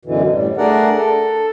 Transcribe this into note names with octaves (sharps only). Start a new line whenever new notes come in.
F#2 B2 D3 E3
A2 G3
A3 D4 G#4 A#4 D5 F#5
A4